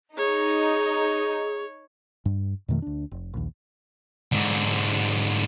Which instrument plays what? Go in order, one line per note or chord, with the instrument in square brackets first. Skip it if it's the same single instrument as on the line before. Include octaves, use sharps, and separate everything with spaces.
[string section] D#4 [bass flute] G#4 [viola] C#5
[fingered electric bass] G2
F2 B2 D#3 A3
D2 D4
F1
A#1 D#2
[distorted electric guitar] G#2 D3